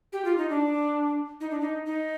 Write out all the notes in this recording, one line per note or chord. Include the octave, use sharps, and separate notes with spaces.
G4
F4
D#4
D4
D#4
D4
D#4
D#4